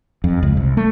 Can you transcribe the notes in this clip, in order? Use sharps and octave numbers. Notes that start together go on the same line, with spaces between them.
F2
C#2
C2
A3